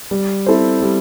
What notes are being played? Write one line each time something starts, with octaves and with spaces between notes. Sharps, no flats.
G3
C4 E4 A4 C5
G3